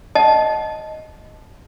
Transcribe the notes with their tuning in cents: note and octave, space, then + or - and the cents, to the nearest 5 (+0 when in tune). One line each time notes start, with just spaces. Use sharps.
D#5 +0 F#5 +0 A5 -15